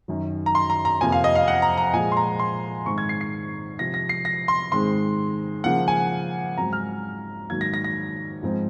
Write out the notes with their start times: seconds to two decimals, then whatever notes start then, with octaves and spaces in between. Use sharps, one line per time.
0.08 F#2 D#3 F#3
0.46 A#5
0.55 C6
0.70 A#5
0.85 A#5
1.01 F2 C3 F3 A#3 G#5
1.12 F5
1.24 D#5
1.35 F5
1.48 F#5
1.62 A#5
1.77 A#5
1.93 A#2 F3 G#3 G#5
2.12 C6
2.17 A#5
2.39 C6
2.86 G#2 D#3 G#3 C4 C#6
2.98 G#6
3.09 C7
3.21 C7
3.79 C3 F3 C4 A#6
3.94 A#6
4.09 C7
4.25 A#6
4.48 C6
4.72 G#2 D#3 G#3 C4 C6
5.64 C#3 F3 A#3 F#5
5.88 G#5
6.58 G#2 F#3 C4 A#5
6.73 F6
7.50 G#2 D#3 F#3 A#3 G#6
7.61 A#6
7.74 A#6
7.84 A#6
8.43 G#2 F3 G#3 C4